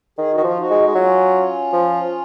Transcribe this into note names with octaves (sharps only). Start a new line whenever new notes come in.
D#3 G#4
F#4
D#3
F3 F4
D#4 F#4
G#3
G#3
F#3 C#4 F4
F3